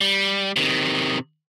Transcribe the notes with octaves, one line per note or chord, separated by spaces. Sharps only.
G3
C3 D#3